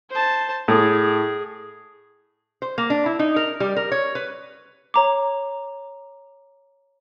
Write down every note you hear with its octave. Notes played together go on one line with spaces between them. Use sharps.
C5 A5
A2 G#4
C5
A#3
D4
E4
D#4
A#4
G3
A#4
C#5
B4
C#5 A#5 D6